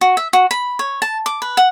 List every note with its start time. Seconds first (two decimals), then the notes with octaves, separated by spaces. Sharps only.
0.01 F#4
0.17 E5
0.33 F#4
0.51 B5
0.79 C#5
1.02 A5
1.26 D6
1.42 B4
1.57 F#5